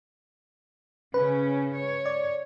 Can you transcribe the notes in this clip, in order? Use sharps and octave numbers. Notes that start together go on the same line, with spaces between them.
C#3 C#4 B4
C#5
D5